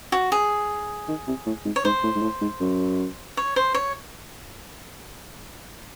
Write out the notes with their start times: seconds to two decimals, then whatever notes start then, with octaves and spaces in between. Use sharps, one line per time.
0.12 F#4
0.32 G#4
1.08 D#3
1.28 C3
1.46 A2
1.65 G#2
1.76 C#5
1.85 G#2 C5
2.04 A2
2.16 G#2
2.22 A2
2.41 G#2
2.61 F#2
3.37 C#5
3.56 C5
3.74 C#5